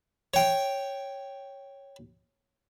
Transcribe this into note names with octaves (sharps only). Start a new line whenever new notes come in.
C#5 G5